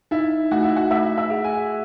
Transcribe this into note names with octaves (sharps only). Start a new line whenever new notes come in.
D#4 E4
A3 F#4
E4
F#4
A3 E5
E5
G#4
G#5